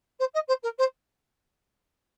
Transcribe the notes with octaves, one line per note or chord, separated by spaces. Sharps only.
C5
D#5
C5
A#4
C5